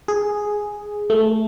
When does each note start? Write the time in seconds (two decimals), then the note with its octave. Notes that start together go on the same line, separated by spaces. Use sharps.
0.08 G#4
1.10 A3